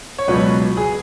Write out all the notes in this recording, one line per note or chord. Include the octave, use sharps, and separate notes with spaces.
C#5
C#2 B2 F#3 B4
G#4